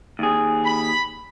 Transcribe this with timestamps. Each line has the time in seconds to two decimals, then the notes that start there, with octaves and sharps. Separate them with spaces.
0.19 D#2 G#4
0.65 B5